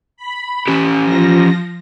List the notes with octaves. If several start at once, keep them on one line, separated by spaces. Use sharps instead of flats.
B5
E3 C#4 G4
F3 A#6